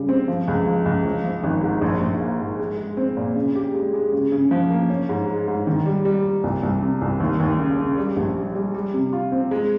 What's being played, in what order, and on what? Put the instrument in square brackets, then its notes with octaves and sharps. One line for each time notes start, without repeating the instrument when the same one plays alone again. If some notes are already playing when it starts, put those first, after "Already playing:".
Already playing: [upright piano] C#3 G3
C4
F3
C#2
F3
C#2
F3
F3
G#1
G#2
A#1
A#1
A#3
G#2
G#3
G#3
C4
A#2
C#3
G4
G#3
G#3
C#3
C#3
F3
A#3
C#4
G#2
G#3
G#2
D#3
G3
G3
G3
C2
C2
C3
C2
D#2
D#2
C#3
C#3
G3
A#1
G3
G3
G3
C3
F4
C4
G#3